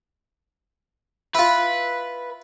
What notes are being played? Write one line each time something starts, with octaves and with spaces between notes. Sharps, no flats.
E4 F4 B4